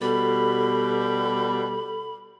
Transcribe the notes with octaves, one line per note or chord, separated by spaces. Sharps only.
B2 G3 A4 B5